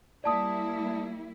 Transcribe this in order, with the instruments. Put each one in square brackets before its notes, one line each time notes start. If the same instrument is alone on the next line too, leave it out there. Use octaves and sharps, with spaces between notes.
[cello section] G3 A#3 E4 [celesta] D5 A5 D#6